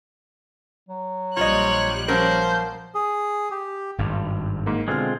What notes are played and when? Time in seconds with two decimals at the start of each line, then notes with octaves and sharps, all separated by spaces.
0.89 F#3
1.37 A#1 G3 F4 C5 C#5 D#5 F#6
2.08 F3 F#3 C#4 A#4 C5
2.95 G#4
3.51 G4
3.98 G#1 G2
4.66 G#2 A#3
4.88 B2 D3 G#3 C4 F4 F6